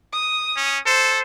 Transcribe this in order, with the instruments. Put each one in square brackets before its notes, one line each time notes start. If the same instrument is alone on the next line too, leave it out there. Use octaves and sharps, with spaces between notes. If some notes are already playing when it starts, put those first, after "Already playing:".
[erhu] D#6
[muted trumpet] C#4
[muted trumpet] A4 [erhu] C5